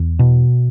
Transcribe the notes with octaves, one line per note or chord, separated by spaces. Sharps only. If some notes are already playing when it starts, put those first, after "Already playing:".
Already playing: E2
B2